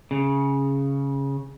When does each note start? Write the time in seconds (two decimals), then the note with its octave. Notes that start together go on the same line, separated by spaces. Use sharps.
0.11 C#3